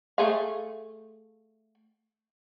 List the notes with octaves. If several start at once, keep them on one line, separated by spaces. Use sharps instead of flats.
A3 G#4 F5